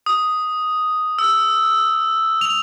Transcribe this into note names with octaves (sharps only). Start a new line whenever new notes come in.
D#6
E6
F7